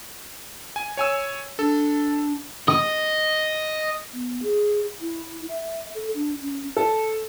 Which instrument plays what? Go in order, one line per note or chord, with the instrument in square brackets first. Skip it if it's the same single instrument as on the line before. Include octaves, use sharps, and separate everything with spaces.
[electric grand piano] G#5
C#5 G#5 E6
[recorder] D4 [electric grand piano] A4
[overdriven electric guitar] D#5 [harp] D#6
[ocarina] B3
G#4
E4
E5
A4
D4
C#4
[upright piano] A4